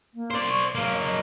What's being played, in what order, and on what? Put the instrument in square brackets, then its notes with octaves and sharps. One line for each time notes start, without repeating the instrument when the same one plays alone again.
[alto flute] A#3
[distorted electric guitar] C5 D5
[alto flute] C#6
[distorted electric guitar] F#3 A#3 [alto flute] F5
[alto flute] D#5